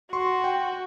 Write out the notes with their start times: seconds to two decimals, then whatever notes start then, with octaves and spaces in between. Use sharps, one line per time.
0.13 F#4 C6 C#6
0.44 G5